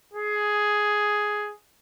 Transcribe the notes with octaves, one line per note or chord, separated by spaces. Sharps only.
G#4